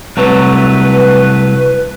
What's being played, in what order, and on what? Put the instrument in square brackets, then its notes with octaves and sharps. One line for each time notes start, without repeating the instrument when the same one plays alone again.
[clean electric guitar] C2 F#3 A3 [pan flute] B4